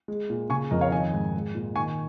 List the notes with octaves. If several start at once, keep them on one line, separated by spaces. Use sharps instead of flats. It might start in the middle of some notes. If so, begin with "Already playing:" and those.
G#3
A#2
C#3 G#5 C#6
F2 A#4 D#5
C#5 F5
D#3 D#5 G#5
G#2
G#3
A#2
D#3 G#5 C#6